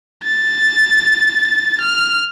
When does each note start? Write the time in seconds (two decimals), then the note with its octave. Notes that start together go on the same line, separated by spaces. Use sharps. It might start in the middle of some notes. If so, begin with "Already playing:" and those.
0.24 A6
1.81 F6